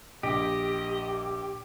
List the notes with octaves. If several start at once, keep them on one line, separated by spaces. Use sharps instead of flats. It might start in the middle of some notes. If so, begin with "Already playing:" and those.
A#1 G4 D#5